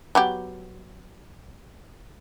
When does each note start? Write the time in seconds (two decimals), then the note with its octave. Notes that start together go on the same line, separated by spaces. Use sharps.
0.15 F#3 B3 G4